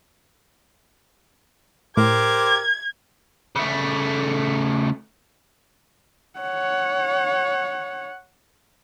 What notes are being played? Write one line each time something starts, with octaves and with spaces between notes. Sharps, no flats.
A2 G4 A#4 C5 D6 G#6
C#3 A3
C#5 F#5